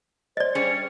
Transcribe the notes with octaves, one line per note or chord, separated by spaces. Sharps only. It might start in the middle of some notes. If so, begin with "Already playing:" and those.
C5 D5 D#5
G3 C#4 G#4 C#7